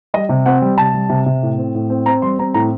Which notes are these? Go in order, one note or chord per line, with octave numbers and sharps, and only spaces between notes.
G3 D#5
C3
C4 F#5
G3
C3 A5
G3
C3
C3
A2
C4
A2
C4
C4 A#5
G3 C6
C4 A#5
A2 A#5